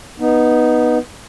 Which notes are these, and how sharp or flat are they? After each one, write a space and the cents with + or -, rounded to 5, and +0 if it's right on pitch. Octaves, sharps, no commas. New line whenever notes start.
B3 -10 D#4 +0